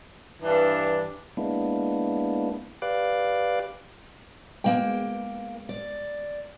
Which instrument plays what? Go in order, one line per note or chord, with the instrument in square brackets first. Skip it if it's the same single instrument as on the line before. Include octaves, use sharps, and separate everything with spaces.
[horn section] G2 E3 D4
[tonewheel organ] G#3 A#3 B3 D4 E4
G4 B4 D5 F5 D6 F#6
[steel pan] G#3 B3 [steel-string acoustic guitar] A#3 G5
[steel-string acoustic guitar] D5